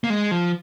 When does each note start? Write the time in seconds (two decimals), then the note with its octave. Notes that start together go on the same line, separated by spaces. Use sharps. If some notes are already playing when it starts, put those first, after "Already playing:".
0.04 A#3
0.10 G#3
0.31 F3